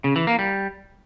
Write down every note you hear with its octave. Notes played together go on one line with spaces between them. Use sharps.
C#3
E3
A#3
G3